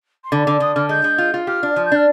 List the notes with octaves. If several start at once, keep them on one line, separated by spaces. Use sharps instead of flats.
C6
D3 B5
D3 D6
D3 D#6
D3 F6
G#3 G6
G#3
F4
F4
G4 F6
D4
F3
G6
D4 F6